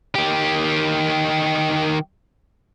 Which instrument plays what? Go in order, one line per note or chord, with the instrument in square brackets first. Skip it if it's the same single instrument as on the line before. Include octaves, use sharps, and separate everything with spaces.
[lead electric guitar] D#3 G4